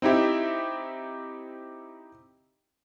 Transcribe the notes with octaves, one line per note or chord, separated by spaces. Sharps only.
C4 D#4 E4 G4 E5